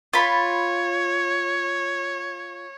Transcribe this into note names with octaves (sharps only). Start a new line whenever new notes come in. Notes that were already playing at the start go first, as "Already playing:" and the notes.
F4 C#5 B5